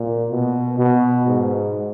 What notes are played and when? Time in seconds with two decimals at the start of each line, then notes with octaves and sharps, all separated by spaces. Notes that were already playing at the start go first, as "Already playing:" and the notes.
Already playing: A#2
0.31 B2
0.79 B2
1.27 G#2